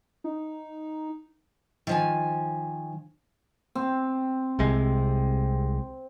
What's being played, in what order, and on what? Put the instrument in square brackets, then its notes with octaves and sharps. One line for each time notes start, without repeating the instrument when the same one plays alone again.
[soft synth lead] D#4
[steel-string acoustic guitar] D#3 F3 G#5
[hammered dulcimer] C4
[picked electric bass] C2 C3 G#3